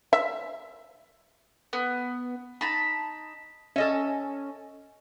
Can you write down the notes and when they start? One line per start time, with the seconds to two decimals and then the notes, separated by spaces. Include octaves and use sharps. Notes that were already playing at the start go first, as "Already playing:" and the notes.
0.13 E5
1.73 B3
2.61 D#4 A5 B5
3.76 C#4 A4 D#5 E5